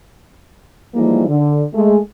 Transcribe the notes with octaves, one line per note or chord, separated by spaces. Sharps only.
E3 F3 G3 G#3 A#3 D#4
D3
G#3 A3